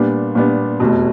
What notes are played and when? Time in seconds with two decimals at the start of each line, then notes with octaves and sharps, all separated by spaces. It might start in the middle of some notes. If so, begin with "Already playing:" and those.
Already playing: A#2 G3 B3 D4
0.35 A#2 G3 B3 D4
0.80 F1 E2 B2